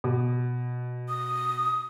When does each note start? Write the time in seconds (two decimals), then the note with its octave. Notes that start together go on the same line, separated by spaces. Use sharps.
0.04 B2
1.09 D#6